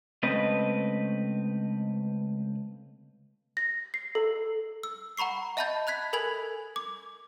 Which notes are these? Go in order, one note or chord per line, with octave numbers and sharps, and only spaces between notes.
C#2 A3 C4 B4 D#5
A#6
C7
A4
E6
F#5 A#5 B5 C#6 C7
D#5 E5 A5 B5 G6 A6
B5 F#6 G#6 B6
A4 A#4 G#5 B5 G#6
D6